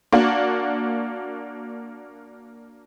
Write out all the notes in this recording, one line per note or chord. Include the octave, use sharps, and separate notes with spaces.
A#3 D4 F#4